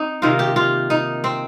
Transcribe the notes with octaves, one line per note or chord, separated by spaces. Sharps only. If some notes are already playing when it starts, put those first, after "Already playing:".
Already playing: C4 D#4
C3 D#3 A#3 F4
G4
F4
D#4
C4